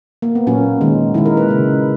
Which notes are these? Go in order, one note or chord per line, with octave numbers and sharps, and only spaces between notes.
A#3
B3
A#2 F#3 A#3 C#4
D#3 G#3
D#3 G#3 E4
A#4
B4
C#3 G#3